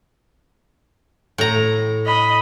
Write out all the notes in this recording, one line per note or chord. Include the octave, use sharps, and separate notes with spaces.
A2 A#5
D#5 B5